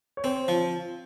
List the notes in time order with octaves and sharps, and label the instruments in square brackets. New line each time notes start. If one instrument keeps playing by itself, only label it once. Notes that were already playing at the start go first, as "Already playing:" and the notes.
[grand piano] C#5
[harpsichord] C4 [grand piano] C5
[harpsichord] F3